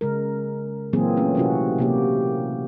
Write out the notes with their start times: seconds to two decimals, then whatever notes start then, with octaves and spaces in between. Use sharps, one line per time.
0.01 C#3 G#3 A#4
0.93 A#2 E3 F#3 A#3 C4 G#4
1.17 A3 C#4
1.35 C3 F#3 C#4 E4 F#4
1.79 C3 A#3 G4